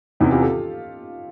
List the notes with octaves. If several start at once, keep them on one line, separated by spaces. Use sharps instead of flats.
E2 C3 E3 C#4 D#4
F4 G4
G4 A4